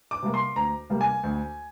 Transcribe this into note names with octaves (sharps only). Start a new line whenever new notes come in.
D6
C3 G3 A#3
C6
D2 A#5
C3 G3 A#3
G#5
D2